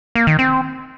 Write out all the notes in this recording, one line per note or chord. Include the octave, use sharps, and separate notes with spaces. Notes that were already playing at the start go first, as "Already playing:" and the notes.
A#3
D#3
C4